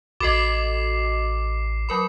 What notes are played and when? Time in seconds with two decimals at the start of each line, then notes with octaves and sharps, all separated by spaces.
0.20 A1 F#4 A4 D#5 D6 C7
1.89 F#3 A#4 B5